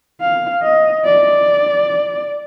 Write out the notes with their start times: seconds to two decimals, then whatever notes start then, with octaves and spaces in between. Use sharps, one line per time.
0.21 F5
0.63 D#5
1.05 D5